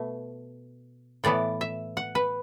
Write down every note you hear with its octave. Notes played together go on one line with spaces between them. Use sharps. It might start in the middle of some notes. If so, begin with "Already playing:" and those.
Already playing: B2 A3
A2 E3 B3 D5
E5
F#5
B4